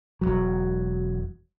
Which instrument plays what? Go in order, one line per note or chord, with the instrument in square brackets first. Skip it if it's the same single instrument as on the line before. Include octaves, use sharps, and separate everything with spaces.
[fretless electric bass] E1 C#2 F#3